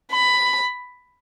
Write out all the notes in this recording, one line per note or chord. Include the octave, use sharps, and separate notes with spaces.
B5